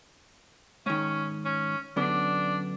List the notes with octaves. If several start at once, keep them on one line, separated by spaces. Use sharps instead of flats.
G#2 D#3 C#4
C#4
F#2 D3 B3 D4